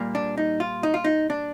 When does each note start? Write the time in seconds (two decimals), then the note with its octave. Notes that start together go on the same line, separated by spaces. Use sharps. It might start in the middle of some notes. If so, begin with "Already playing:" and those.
Already playing: A#2 G3 A#3
0.15 D4
0.37 D#4
0.60 F4
0.83 D#4
0.94 F4
1.04 D#4
1.30 D4